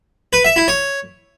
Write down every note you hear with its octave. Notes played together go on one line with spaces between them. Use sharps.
B4
E5
E4
C#5